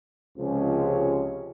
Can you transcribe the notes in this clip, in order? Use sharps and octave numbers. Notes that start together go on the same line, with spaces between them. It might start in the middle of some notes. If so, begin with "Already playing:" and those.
C#2 C3 F3 G#3 C#4